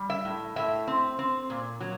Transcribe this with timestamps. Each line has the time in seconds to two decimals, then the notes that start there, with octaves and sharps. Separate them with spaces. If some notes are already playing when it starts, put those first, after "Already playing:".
Already playing: G3
0.10 E5
0.25 A2
0.56 A2 E5
0.87 C4
1.19 C4
1.50 A#2
1.81 F#3